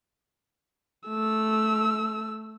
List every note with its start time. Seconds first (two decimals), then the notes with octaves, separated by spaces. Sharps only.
1.08 A3 E6